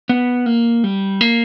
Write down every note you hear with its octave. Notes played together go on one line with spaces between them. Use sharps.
B3
A#3
G3
A#3